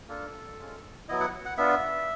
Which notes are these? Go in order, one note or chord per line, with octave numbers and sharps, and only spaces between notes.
A#3 D4 F4 A4
G#3 C#4 F4
F#3 B3 E4 D#5
F#5
F#5
B3 D4 F4 E5